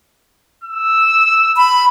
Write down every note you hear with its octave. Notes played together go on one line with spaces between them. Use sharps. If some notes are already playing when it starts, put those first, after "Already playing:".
E6
B5